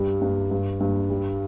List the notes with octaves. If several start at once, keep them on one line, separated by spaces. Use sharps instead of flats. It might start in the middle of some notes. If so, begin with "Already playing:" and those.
Already playing: G2 G3
G2
G2
G2
G3